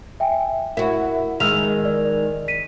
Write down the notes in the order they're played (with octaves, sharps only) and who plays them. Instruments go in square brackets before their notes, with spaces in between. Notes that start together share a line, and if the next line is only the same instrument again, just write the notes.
[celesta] E5 G5 G#5
[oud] E4 F#4 [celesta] A#4 E5
[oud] D#3 G#3 [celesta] E6 F6 F7
[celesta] D5
B6 D#7